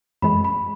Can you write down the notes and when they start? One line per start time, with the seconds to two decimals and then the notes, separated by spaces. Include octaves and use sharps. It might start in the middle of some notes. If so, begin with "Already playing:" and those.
0.22 F#2 E3 G#3 B5
0.44 B5